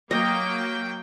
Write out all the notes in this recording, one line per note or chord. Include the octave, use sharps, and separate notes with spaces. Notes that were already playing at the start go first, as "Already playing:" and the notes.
F#3 A#3 D#5 G5